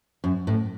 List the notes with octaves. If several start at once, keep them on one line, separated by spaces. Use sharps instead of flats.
F#2
A2